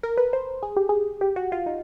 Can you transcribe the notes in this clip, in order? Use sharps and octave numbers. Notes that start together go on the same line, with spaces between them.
A#4
B4
C5
G#4
G4
G#4
G4
F#4
F4
D#4